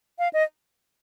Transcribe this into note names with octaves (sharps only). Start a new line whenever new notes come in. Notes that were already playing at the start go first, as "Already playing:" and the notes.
F5
D#5